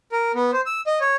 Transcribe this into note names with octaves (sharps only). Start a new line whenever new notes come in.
A#4
B3
C5
E6
D#5
C#5